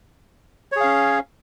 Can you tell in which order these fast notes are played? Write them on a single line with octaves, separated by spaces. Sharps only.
C#5 G#4 F5 C#4